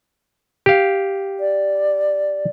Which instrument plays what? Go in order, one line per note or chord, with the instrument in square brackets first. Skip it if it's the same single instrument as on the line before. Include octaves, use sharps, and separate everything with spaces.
[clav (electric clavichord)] G4 F5
[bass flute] D5